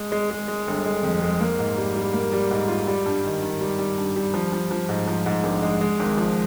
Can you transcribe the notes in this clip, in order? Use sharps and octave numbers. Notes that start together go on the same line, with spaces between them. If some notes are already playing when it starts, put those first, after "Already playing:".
Already playing: G#3
G#3
G#3
G#3
G1
G#3
F2
G#3
A#3
G#2
G3
G3
A#3
G3
G#2
F4
G3
G2
D#3
D#3
G3
G3
G2
G3
F3
F3
F3
G#2
F3
G#2
A#1
G#3
G#3
G#1
F3